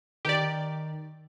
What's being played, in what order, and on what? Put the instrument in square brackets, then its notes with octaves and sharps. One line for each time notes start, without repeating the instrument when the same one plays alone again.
[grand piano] D#3 [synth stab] G4 D5